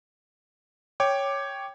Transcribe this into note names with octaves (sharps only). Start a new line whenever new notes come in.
C#5 G5 D6